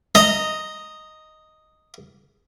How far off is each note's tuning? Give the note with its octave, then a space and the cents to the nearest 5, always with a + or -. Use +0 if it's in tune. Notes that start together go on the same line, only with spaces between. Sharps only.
D#5 +0 A#5 -15